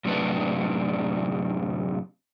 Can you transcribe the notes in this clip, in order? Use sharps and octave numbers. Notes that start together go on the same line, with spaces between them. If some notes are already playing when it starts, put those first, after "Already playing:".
F#2 A2 C3 D4 B4 D5